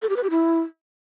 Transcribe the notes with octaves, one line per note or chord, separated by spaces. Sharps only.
A4
G4
B4
G4
E4